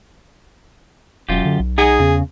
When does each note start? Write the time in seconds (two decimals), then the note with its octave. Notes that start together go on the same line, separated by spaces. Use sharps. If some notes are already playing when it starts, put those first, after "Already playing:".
1.29 E1 F#2 F4 G4
1.45 D3
1.59 B1
1.78 D#4 G#4 F#5 G#5
2.00 E2 C#3